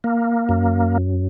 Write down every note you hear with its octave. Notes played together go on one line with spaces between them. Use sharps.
A#3
F#2